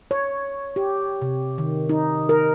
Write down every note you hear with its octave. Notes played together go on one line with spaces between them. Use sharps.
C#5
G4
C3
D#3
D#4
A#4